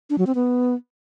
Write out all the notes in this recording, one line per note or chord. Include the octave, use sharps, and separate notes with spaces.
D4
F#3
C4
B3